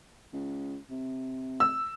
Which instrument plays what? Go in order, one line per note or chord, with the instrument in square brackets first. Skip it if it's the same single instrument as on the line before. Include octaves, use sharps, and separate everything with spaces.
[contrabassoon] C#2
C3
[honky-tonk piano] E6